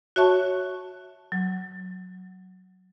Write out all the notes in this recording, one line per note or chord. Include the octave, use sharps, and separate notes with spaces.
F#4 C#5 E5 A5 C#6
F#3